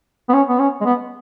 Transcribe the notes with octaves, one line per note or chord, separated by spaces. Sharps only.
B3
C#4
B3
C#4
G#3
B3